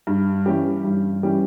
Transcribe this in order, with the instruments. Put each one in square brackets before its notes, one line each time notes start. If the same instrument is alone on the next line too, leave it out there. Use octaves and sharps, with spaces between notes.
[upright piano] G2
E3 G3 C#4 G4
G2
E3 G3 C#4 G4